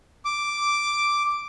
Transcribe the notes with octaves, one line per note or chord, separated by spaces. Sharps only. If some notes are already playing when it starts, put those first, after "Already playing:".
D6